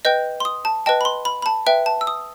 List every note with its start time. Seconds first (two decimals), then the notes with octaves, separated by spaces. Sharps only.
0.05 B4 D#5 G5 G6
0.40 C6
0.45 D#6
0.65 A5
0.86 B4 D#5 G5 A5
1.01 B5
1.05 C6
1.25 B5
1.42 B5
1.46 A5
1.66 B4 E5 G5
1.86 A5
2.01 E6
2.07 D#6